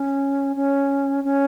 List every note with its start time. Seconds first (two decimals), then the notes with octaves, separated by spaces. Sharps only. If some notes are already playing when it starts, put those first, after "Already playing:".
Already playing: C#4
0.56 C#4
1.24 C#4